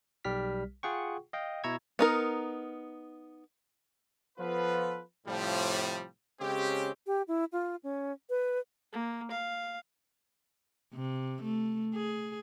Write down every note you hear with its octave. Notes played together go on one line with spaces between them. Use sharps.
B1 G3 G4 F6 B6
F4 G#4 F#5 G5 C#6
D#5 F5 G5
B2 E4 A#5 C#6 E6 G#6
B3 D#4 A#4
F3 B3 F4 A4 B4
A2 C3 F3 G3
C#3 G#3 C4 C#4 G4
G4
E4
F4
C#4
B4
A#3
F5
C3
A3
G#4